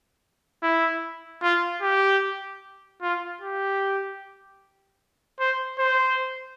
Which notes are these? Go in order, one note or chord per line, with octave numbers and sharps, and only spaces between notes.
E4
F4
G4
F4
G4
C5
C5